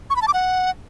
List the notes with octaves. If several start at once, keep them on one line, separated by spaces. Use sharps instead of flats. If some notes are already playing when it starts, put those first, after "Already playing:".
C#6
B5
A5
D6
F#5